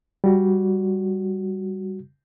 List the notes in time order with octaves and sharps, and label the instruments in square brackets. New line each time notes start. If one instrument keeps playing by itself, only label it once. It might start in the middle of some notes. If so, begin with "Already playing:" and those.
[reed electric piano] G3 F#4